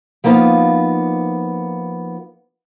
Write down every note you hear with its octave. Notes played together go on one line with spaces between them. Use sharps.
F3 A#3 B3 D#4 F4